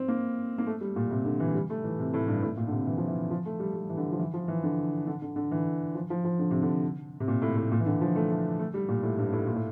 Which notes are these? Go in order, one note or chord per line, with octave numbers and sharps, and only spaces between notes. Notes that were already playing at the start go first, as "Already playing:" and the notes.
Already playing: C4
A#3
A#3
A3
G3
A#2
C3
D3
E3
G3
A3
E3
C3
A2
G2
A2
A#2
D3
C3
E3
F3
E3
F3
A3
G3
G3
E3
D3
F3
E3
F3
E3
D3
D3
D3
D3
E3
F3
F3
F3
D3
C3
D3
C3
A#2
A2
A2
A#2
E3
D3
F3
A3
A3
A3
G3
A#2
A2
G2
A2
A#2
A2